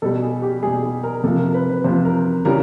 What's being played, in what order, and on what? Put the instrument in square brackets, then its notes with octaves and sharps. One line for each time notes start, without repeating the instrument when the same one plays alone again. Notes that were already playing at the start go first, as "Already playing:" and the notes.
[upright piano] B2 G3 A4
G#4
G4
B2 G3 G#4
G#4
A#4
C3 A4
F3
A#4
B4
B4
C3 F3 C5
A#4
C#3 E3 G3 A#4